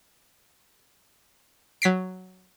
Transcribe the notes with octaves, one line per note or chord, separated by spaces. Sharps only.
F#3 B6 C7 D7